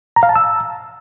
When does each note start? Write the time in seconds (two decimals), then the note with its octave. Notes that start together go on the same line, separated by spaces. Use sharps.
0.16 A#5
0.23 F5
0.29 A5
0.36 E6